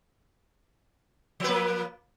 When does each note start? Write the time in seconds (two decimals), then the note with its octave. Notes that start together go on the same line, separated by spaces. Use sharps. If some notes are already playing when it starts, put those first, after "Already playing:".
1.40 F3
1.44 B4
1.48 A#3